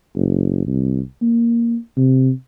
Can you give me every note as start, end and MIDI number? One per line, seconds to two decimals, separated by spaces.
0.15 0.63 30
0.66 1.00 36
1.22 1.76 58
1.97 2.30 48